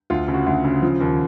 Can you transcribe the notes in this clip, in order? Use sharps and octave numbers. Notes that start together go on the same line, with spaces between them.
D2 F4
C#3
F#4
D2
C#3
F3
D#2